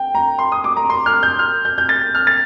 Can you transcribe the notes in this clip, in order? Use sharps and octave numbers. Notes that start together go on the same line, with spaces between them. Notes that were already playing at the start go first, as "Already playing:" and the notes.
Already playing: G5
A#5
C6
D#6
D6
A#5
C6
F6
G6
F6
G6
G6
A6
F6
A6